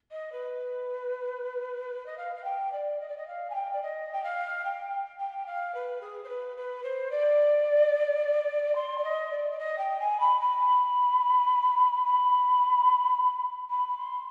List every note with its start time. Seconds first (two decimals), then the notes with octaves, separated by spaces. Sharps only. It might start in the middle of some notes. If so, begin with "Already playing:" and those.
0.11 D#5
0.32 B4
2.06 D#5
2.17 F5
2.35 F5
2.44 G5
2.72 D5
3.00 D#5
3.08 D5
3.17 D#5
3.27 F5
3.49 G#5
3.54 G5
3.73 D5
3.82 D#5
4.12 G5
4.23 F5
4.64 G5
5.19 G5
5.46 F5
5.74 B4
6.00 G#4
6.23 C5
6.28 B4
6.56 B4
6.83 C5
7.11 D5
8.75 C6
8.97 D5
9.04 D#5
9.30 D5
9.51 D5
9.58 D#5
9.78 G5
9.99 G#5
10.20 B5
10.40 B5
12.04 B5
13.69 B5
13.88 B5
13.97 C6